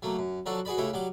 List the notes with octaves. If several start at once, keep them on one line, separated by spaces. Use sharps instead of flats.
F#3 A3 A#3
F#2
F3 F#3 D4 F#4 A4
F#4 G#4 B4 D5 B5
C#2 C#3 A3 E4 G4 C#5
F#3 G3 D6